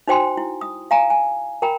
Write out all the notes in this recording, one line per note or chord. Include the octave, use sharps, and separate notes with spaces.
D#4 F#4 C5 G5 G#5 C6
E4
D#6
F5 G#5 A#5
G#5
A#4 G5 A#5 B5